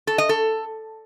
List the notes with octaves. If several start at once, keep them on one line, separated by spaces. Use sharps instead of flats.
A4
D#5
A4